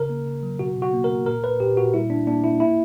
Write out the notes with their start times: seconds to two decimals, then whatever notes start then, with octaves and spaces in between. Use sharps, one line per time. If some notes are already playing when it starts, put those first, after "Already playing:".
Already playing: C#3 A#4
0.09 A#3
0.26 C#3
0.43 F#3
0.59 B2 F#4
0.76 B2
0.82 F#4
0.93 A#3
1.04 A#4
1.10 A#3
1.26 A#2 A#4
1.43 A#2 B4
1.60 A#2 G4
1.77 A#2 F#4
1.94 G3 E4
2.10 A#3 D4
2.27 A#3 D4
2.44 A#3 E4
2.60 A#3 E4